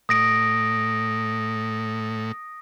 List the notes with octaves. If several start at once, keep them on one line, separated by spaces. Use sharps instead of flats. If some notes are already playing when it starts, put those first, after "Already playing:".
A2 D#6 A#6 D7